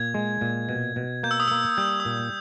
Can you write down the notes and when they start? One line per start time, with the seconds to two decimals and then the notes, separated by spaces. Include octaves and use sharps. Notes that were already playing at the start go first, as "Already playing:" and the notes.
Already playing: A#2 G#6
0.14 G#3
0.41 A#2
0.69 B2
0.96 B2
1.23 A#3 G6
1.31 E6
1.40 D#6
1.48 A#3 E6
1.78 G3 G6
1.89 E6
2.00 D#6
2.05 A#2
2.11 E6